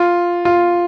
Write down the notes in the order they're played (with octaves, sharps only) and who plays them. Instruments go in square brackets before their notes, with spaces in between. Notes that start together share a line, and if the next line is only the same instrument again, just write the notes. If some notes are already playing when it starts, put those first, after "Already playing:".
Already playing: [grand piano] F4
F4